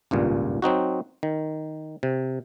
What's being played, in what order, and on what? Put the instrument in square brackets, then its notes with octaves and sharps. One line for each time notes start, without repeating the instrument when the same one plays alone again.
[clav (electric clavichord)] G#1 C#2 G2 A#2
F#3 C4 D#4 F#4
D#3
C3